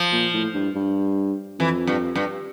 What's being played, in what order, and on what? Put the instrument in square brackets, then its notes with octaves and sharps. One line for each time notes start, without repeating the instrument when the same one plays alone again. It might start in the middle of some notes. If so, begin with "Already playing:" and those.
Already playing: [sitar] F3
[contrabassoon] A#2
A2
G2
G2
[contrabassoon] F2 [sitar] E3
[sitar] G2
G2